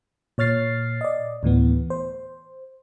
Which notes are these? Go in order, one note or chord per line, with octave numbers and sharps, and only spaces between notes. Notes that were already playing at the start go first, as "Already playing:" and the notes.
A#2 C#5 F6 A6 C7
D5 D#5
D2 A2 E3 B3
C5